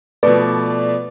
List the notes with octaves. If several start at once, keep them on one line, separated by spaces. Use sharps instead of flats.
B2 F3 A3 B4 D5 D6